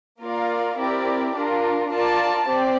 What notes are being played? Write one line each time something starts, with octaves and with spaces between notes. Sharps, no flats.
A#3 F4 A#4 D5 F5
C4 E4 G4 A#4 D5
D4 F4 A#4
F4 A#4 D5 A5
C4 G4 D5